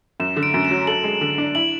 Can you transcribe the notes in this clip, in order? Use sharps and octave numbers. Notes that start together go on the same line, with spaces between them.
F#2 E7
D3
D7
F#2
E7
F#3
A4 F#7
G#3
D3
D4
E4 F#7